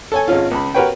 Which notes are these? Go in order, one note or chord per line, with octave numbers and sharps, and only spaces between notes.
A4 C#5 G#5
G#1 C#4 F4
C#2 B5
F#4 G4 A#4 B4 C#5 G5